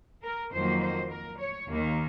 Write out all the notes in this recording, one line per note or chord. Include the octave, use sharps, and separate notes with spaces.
A#4
F2 D#3 F#3 A#3 C5
C5
A#4
C#5
D#2 D#3 A#3